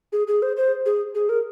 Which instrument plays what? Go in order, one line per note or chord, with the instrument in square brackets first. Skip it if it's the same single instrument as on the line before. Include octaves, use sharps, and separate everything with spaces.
[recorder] G#4
G#4
C5
C5
G#4
G#4
A#4